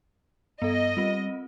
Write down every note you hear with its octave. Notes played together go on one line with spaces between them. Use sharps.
G2 B3 A4 D#5
G3 C4 F4